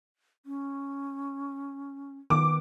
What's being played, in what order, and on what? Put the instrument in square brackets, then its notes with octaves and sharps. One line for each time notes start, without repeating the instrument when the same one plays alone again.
[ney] C#4
[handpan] D#3 B3 [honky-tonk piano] D6